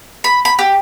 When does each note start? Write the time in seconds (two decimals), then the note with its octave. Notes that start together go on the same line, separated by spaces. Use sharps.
0.24 B5
0.45 B5
0.59 G4